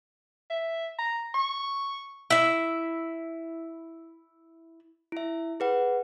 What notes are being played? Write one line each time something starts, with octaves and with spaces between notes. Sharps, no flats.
E5
A#5
C#6
E4 E5
E4 E5
G#4 B4 F#5